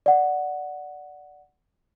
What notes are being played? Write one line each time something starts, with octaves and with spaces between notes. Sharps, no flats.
D5 F#5